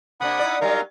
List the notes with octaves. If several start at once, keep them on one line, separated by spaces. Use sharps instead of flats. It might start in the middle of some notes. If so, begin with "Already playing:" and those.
C3 A#3 D4 F#5 B5 D#6
D#4 E4 D5
F#3 G3 D#4 A#4 F5 A#5